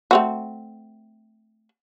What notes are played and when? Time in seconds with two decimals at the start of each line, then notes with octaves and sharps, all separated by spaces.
0.11 A3 C4 F#4